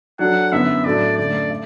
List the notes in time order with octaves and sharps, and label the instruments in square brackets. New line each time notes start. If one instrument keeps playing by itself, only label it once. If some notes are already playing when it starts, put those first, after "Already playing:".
[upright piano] F#3 D4 A4 [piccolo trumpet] F#5
[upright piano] F#2 D3 B3 E4 [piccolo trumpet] E5
[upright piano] A2 F#3 A3 D4 [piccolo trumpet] D5
[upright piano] F#2 D3 A3 [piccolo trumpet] D5
[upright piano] A4 E5